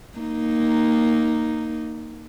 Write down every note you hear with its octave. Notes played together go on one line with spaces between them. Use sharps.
A#3 D#4